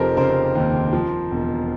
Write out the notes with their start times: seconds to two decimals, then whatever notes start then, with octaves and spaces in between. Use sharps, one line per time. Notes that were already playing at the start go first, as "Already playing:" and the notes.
Already playing: F1 F3 G4 A4 A#4 C5
0.17 C#3 A#4 C5
0.55 D#2
0.93 F3
1.31 E1